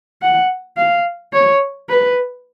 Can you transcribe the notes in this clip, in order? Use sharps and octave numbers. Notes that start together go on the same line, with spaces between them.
F#5
F5
C#5
B4